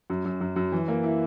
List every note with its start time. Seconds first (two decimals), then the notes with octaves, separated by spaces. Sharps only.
0.10 F#2
0.25 F#2
0.41 F#2
0.56 F#2
0.72 E3
0.88 A#3
1.03 E4